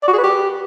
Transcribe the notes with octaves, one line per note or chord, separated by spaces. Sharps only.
D5
F#4
G#4
B4
G4